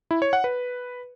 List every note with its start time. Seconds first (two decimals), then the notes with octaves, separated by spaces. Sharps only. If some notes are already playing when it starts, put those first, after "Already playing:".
0.11 E4
0.22 C#5
0.33 F#5
0.44 B4